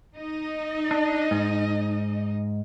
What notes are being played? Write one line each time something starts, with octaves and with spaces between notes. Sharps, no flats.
D#4 D#5
D4
G#2